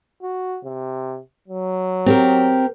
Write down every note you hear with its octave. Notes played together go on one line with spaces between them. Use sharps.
F#4
C3
F#3
C4 G4 A#4